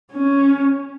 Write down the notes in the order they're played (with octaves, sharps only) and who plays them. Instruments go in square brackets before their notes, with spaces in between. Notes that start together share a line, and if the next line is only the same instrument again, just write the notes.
[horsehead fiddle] C#4